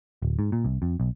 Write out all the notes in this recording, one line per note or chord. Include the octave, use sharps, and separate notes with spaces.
D1
G#2
A#2
C2
F2
B1